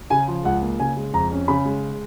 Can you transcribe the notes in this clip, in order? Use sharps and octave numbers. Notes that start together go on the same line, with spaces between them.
C#3 G#5
F3
C#2 F#5
A#3
C#3 G#5
G#3
F2 A#5
C#4
C#3 B5
G#3